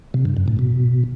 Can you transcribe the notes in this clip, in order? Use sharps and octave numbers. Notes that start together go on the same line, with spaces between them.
C3
G2
F#2
A2
B2